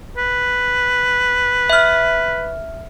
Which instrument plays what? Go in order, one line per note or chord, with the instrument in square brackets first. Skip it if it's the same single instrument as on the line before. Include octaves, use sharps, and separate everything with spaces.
[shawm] B4
[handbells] E5 F6